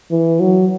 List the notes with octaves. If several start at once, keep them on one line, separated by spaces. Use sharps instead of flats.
E3
F#3